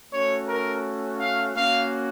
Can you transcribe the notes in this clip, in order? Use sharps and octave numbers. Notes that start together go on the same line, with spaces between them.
A3 C#4 F#4 C#5
A#4
F5
A#3 C#4 F#4 F5